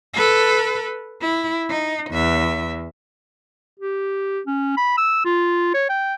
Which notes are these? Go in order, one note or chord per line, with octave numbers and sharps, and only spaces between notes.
A4 B4
E4
D#4
E2 E5
G4
C#4
B5
E6
F4
C#5
G5